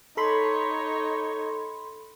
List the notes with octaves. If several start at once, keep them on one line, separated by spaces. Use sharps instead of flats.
D#4 A4 C#5 B5 C6